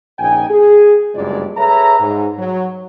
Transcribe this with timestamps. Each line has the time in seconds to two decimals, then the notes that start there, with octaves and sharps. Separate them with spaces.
0.19 A#1 C#3 D#4 G5 G#5
0.50 G#4
1.15 F#1 C2 G2 G#3 F4 D5
1.57 G#4 A4 B4 C#5 E5 A#5
2.00 G#2
2.39 F#3